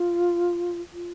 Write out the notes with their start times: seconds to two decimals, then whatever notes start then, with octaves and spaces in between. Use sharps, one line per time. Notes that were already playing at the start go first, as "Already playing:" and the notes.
Already playing: F4
0.93 F4